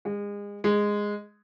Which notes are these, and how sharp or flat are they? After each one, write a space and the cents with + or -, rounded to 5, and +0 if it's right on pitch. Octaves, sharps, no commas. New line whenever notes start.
G#3 -30
G#3 -5